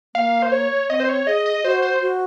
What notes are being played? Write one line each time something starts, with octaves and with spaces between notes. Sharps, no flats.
A#3 F5
C5
C#5
C4 D#5
C5
C#5
G#4 D#5
D#5
F#4 C5
C5
F#4